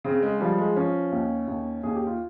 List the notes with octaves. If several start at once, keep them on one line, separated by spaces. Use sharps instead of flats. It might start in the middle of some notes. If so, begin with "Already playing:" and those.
C#3 C4
G#3
F3 G3
G#3
F3 C#4
D#2
D#2
D#2 G#4
G4
F4